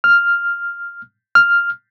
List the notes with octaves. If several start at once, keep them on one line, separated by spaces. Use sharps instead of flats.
F6
F6